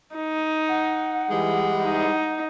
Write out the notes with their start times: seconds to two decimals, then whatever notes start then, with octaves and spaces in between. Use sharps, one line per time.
0.16 D#4
0.68 F#5
1.31 E3 G3 G#3
1.84 D#4